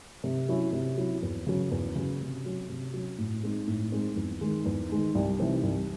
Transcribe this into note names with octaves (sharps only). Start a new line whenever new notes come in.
C3
F#3 C#4 E4
C3
F#3 C#4 E4
E2
C#3 F#3
E2
C#3 F#3
C3
F#3 C#4
C3
F#3 C#4
A2
G#3 C4 D#4
A2
G#3 C4 D#4
E2
D#3 G#3 D#4
E2
D#3 G#3 D#4
C2
C3 E3 C4 D#4
C2